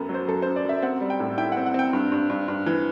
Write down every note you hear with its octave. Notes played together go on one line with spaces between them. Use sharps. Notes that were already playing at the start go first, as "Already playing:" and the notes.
Already playing: F#2 B3 A4
F#3
C5
F#2 A4
C5
F#2
D5
F#2 E5
C4 F#5
G3
G5
A2
E4 G5
F#5
C4
F#5
C4 G5
G2
G2
G2
G2
E3